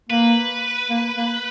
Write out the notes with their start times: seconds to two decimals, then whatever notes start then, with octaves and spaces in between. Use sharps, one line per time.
0.09 A#3 B4
0.90 A#3
1.17 A#3